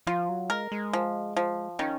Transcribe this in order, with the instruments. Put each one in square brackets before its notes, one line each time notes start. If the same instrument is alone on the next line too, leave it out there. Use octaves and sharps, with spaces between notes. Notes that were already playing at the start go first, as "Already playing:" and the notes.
[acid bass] F3 [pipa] F4
[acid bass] F#3
[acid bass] G#3 [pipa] A#4
[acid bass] G#3
[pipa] F3
F3
[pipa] D#3 [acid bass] C#4